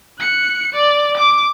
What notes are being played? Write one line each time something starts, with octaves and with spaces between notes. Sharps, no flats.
F#6 C#7
D5
D6